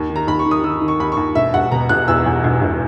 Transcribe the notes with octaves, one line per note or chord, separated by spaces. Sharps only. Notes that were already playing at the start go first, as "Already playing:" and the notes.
Already playing: D#2
D#3
A#5
D#2 B5
C#6
D#3
D#6
D#3 E6
D#3
C#6
D#2 B5
C#6
D#2
E1 E5
E1 F#5
B2 A#5
E1 F#6
E2 E6
E2
E1
E1